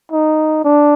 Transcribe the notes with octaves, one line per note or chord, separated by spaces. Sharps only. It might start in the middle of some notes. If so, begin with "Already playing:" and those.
D#4
D4